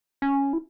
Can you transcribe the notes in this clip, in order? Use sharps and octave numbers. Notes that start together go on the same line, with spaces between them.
C#4
E4